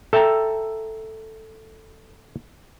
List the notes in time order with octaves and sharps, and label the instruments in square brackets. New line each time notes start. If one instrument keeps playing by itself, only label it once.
[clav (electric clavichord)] A4 E5 G5 A5 A#5